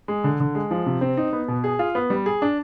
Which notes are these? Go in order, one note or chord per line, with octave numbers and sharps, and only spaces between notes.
G#3
D3
D3
G#3
F3
C3
C4
D#4
B3
B2
G#4
F4
B3
G3
G#4
D4